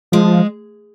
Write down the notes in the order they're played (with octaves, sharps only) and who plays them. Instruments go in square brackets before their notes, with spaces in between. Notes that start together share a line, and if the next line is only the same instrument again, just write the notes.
[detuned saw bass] F3 [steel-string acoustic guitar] G#3